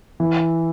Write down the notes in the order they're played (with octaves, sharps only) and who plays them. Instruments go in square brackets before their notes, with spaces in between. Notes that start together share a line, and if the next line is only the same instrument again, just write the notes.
[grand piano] E3